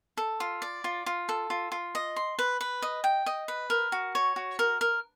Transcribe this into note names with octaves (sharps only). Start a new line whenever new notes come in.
A4
F4
D5
F4
F4
A4
F4
F4
D#5
C6
B4
B4
D#5
G5
D#5
B4
A#4
F#4
C#5
F#4
A#4
A#4